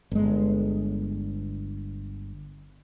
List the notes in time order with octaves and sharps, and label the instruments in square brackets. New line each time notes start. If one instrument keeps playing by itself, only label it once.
[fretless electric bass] G1 G#3